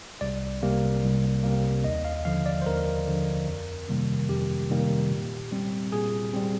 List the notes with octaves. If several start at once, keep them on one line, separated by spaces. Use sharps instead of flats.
C2 D5
C3 G3 A#3
C2
C3 G3 A#3
D#2 D#5
F5
D3 F3 F5
D5
C5
D#2 A#4
D3 F3
F2
C3 D#3 G3 A#3
F2 G4
C3 D#3 G3 A#3
A#2
G3 C4
A#2 G#4
G3 C4